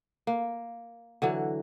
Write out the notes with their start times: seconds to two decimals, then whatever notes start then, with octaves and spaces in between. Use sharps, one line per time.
0.27 A#3
1.22 D3 E3 F#3